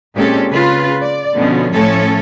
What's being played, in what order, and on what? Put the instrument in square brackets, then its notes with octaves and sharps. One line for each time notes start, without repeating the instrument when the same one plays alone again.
[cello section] A#2 G#3 C4 C#4 G4 A4
C#3 F4 B4
D5
B2 D3 F3 C#4
A2 F3 A3 C#4 A4 C#5